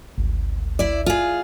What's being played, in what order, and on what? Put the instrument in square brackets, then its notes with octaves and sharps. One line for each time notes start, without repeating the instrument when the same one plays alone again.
[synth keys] G#1 D2
[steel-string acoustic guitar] E4 D5
F4 G#4